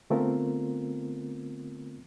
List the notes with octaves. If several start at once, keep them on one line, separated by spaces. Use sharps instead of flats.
D3 A3 B3 C4 F4 A#4